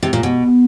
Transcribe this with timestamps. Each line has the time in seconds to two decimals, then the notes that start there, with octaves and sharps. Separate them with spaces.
0.03 C3
0.13 A#2
0.23 B2